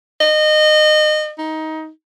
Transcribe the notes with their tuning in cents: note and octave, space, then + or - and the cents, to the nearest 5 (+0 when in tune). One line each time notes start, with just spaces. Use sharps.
D#5 -25
D#4 +20